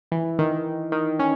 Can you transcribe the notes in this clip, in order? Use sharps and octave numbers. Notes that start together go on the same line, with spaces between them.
E3
D#3
D#3
C#4